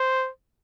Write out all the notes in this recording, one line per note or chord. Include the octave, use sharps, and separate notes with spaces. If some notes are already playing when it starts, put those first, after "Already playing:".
Already playing: C5